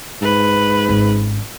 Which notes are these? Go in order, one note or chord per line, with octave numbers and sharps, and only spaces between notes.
G#2 B4
G#1 C#4